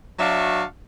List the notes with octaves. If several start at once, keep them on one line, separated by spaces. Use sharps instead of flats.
F#3 D4 F#4 E5 F5